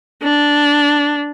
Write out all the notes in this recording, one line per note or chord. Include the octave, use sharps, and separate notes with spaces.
D4